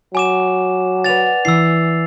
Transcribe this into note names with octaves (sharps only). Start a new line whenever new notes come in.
F#3 G#5 D6 E7
B4 D5 F#5 A6 F7
E3 E4 E6 C7